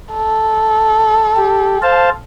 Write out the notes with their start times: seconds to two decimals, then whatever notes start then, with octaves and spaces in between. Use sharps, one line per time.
0.13 A4
1.37 G4
1.82 C5 F5 A5